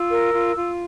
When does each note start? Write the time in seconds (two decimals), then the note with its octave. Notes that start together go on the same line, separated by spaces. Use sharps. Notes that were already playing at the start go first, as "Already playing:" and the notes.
Already playing: F4 E6
0.10 A#4
0.34 F4
0.56 F4